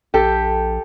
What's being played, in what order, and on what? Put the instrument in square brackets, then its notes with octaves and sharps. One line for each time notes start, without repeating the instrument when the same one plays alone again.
[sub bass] A#1 [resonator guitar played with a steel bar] G4 A4